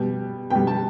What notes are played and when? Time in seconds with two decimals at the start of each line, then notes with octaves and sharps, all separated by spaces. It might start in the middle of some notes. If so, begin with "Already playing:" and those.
Already playing: B2 G3
0.50 B2 G3 G5
0.67 A5